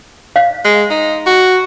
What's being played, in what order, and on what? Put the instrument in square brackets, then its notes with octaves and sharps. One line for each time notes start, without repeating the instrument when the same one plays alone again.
[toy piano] F5
[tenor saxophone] G#3
D#4
F#4